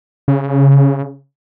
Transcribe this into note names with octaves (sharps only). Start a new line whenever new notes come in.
C#3